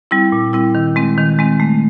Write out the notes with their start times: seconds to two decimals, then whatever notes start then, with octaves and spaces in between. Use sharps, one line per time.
0.11 G3 C4 E4
0.32 A#2
0.53 G3 C4 E4
0.75 D#3
0.96 G#3 C4
1.18 D#3
1.39 G#3 C4
1.60 A3